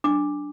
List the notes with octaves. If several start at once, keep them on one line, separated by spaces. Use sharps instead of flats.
D4 D6